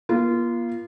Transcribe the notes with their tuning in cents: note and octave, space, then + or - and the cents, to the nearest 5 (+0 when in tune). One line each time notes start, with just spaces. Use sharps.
A#3 +45 F4 -20